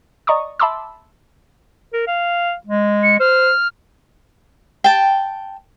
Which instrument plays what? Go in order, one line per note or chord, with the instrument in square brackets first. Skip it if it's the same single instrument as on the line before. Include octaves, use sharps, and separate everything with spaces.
[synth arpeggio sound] D5 D#5 A#5 C#6 D#6
E5 A5 B5 C6 D6 E6
[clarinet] A#4
F5
G#3
[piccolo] C#7
[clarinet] C5 [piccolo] F6
[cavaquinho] G5 A5